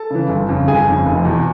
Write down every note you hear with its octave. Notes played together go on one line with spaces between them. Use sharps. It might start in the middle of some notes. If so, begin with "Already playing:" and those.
Already playing: A4 A5
C#3 E3
G1
F2 C#3
G1 G#4 G#5
F2 C#3
F1
E2 B2